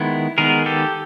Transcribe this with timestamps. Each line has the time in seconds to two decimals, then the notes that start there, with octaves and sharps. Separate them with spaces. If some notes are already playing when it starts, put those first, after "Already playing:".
Already playing: D#3 G#3 B3 E4
0.38 D#3 G#3 B3 G#4 A#4
0.66 G4 A4